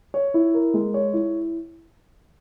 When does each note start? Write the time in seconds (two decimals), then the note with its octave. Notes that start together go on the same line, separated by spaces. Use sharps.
0.14 C#5
0.34 E4
0.54 A#4
0.74 G#3
0.94 C#5
1.13 E4